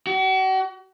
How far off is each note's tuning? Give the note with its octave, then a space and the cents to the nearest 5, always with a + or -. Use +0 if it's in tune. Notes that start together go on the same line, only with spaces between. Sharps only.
F#4 +40